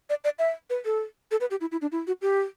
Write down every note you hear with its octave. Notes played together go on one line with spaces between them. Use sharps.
D5
D5
E5
B4
A4
A4
B4
G4
E4
E4
D4
E4
F#4
G4